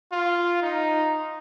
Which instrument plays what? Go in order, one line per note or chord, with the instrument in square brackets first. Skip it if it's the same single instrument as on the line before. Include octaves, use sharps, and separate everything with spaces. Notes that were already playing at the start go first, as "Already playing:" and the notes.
[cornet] F4
D#4